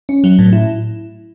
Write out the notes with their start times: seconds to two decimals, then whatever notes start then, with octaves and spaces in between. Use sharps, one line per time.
0.09 C#4
0.24 F#3
0.39 A2
0.53 E4